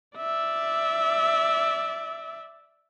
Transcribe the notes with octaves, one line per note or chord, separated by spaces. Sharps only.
D5 E5